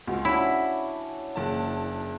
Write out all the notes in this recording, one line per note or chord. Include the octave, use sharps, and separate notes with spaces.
C#2 F#4 C5
C#4 D4 E4 B5
F#1 A5